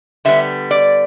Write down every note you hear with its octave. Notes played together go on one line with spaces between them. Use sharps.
D3 G3 B3 E5
D5